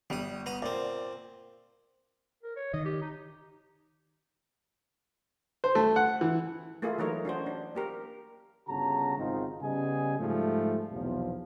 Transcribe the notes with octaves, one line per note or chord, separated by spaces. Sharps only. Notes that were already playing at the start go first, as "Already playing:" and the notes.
G1 G3 D#6 F7
B3 A#5 D#6
A#2 C4 D5
A#4
C#5
D#3 D#5
G4
D#4
C5
A3
F#5
E3
A3 A#3 E4 F4 G#4
E3 F#3 A3 D#4 A#4 C#5
C#4 D4 F#4 C5
D4
A#3 G4 A#4
G1 C#3 F#4 A5 A#5
G#1 G#2 D#3 C4 D#4 F4
C#3 G3 B3 G#4 D#5 G#5
G#2 F3 G3 A3
B1 E2 C3 F3